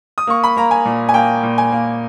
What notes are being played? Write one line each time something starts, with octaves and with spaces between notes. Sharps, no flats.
D#6
A#3 C#6
B5
A#3 A#5
G#5
A#2
G#5
A#3 G5
A#2
G#5
A#3